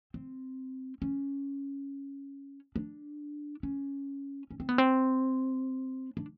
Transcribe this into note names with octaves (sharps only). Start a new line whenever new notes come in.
C4
C#4
D4
C#4
C#4
C4
B3
C4
D4